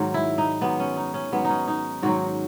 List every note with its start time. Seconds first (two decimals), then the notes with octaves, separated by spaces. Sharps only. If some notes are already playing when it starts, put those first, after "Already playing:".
Already playing: G#2 D#3 F#3
0.14 E4
0.38 D#4
0.61 G#2 D#3 F#3 B3
0.80 C#4
0.97 D#4
1.14 C#4
1.32 G#2 D#3 F#3 B3
1.45 C#4 D#4
1.68 D#4
2.02 G#2 D#3 F#3 F#4